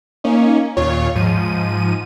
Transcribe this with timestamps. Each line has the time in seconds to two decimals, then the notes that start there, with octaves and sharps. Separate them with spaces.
0.24 A#3 C#4 D#4
0.77 D#2 A#2 F4 C#5
1.16 G#2 F3 D#7